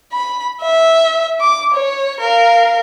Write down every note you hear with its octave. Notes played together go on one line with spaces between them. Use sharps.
B5
E5
D6
C#5
A#4 F5